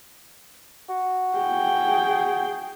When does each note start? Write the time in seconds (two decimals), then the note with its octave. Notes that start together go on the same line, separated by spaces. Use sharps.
0.89 F#4
1.37 G#4 G5